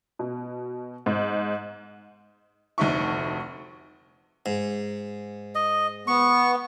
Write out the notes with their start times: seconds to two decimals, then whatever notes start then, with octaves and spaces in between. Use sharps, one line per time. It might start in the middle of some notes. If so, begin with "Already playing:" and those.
0.19 B2
1.06 G#2
2.78 F1 D2 D#4 E5 C#6
4.46 G#2
5.55 D#5
6.07 B3 C#6